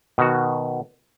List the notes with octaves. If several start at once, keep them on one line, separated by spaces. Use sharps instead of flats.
B2 D#3 F#4